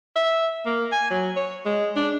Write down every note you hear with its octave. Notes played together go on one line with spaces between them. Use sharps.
E5
A#3
G#5
F#3
C#5
G#3
D4